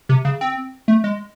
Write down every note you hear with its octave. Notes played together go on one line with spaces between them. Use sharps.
C3
C#3
C4
A3
G#3